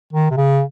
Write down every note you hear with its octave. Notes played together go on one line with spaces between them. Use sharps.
D#3
C3
C#3